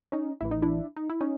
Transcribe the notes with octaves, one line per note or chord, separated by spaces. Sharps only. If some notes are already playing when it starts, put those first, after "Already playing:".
C#4 D#4
A1 A2 E3 E4
D#4
D4 E4
D#4
E4
C#4 D#4